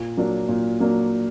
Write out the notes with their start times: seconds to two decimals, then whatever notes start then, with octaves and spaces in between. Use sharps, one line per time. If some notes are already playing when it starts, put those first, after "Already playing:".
Already playing: A#2
0.17 F#3 A#3 D4
0.48 A#2
0.80 F#3 A#3 D4